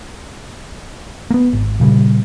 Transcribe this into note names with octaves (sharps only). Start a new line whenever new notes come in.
A#3 B3
G#1
A#2 C#3 G3